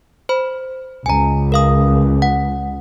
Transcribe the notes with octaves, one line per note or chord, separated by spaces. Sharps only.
C5 B5
C#2 G#5 A#5
A#4 F5 D#6
F#5